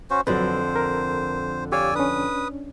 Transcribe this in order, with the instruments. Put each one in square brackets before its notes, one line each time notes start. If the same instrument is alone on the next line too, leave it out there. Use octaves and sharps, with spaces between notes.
[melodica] C#4 F#4 C5
[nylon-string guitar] F2 D3 [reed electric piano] F#3 B4 [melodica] C5
[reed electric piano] A#4
[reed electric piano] G4 C#5 F5 [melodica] D5 G#5 E6
[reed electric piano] C#4 D4 [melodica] B4 D#6